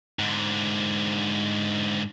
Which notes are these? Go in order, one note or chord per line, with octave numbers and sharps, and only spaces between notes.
G#2 D3